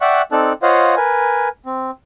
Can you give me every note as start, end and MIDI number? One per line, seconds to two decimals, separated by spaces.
0.01 0.22 74
0.01 0.22 76
0.01 0.22 78
0.01 0.22 79
0.01 0.22 85
0.01 0.22 90
0.32 0.53 60
0.32 0.53 63
0.32 0.53 69
0.32 0.53 74
0.32 0.53 81
0.32 0.53 90
0.62 0.95 65
0.62 0.95 72
0.62 0.95 73
0.62 0.95 75
0.62 0.95 77
0.62 0.95 78
0.96 1.49 70
0.96 1.49 71
0.96 1.49 80
1.66 1.91 60